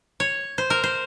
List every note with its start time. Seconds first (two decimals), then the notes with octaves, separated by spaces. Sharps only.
0.20 C#5
0.58 C5
0.70 A#4
0.83 C5